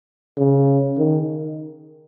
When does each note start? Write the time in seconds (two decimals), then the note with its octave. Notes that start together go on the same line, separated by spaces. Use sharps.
0.37 C#3
0.98 D#3